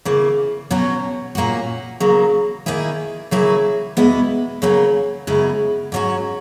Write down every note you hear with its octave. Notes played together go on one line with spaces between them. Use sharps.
C#3 E3 A#3
B2 F#3 C#4 F#4
A#2 A#3 C#4 F#4
C#3 F#3 A#3
D#3 A#3 E4 G#4
C#3 F#3 A#3 E4 G#4
E2 B2 G#3 B3 E4
C#3 F#3 A#3 C#4
F#2 C#3 G#3 B3 E4
G#2 F#3 C#4 F#4